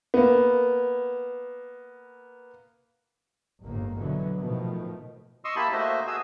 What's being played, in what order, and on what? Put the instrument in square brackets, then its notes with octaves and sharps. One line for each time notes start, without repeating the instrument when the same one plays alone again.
[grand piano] A#3 B3
[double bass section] G1 D#2 G#2 A#3
B2 D3 E3 F#3
B2 D#3 F3 A3
[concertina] D#5 C6 C#6 D#6 E6
A#3 E4 G4 A5 B5 E6
A3 A#3 F#4 C5 D#5 E5
F#4 G#4 D#6 E6